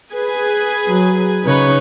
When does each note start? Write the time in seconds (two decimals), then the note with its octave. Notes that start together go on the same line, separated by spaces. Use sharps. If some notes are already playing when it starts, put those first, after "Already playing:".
0.13 G#4 B4 G#5
0.87 F#3
1.45 C#3 D#4 B4 C#5